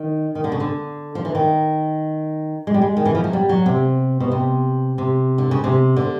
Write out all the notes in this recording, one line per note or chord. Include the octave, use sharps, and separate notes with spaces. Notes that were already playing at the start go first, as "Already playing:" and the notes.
Already playing: D#3
D#3
D3
C#3
D3
F3
E3
D#3
G#3
G3
G#3
D#3
E3
F3
F#3
G3
F#3
C3
B2
C3
C3
D3
C#3
C3
D3